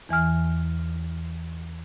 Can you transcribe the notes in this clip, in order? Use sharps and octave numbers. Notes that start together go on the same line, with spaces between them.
E2 E3 G#5 F6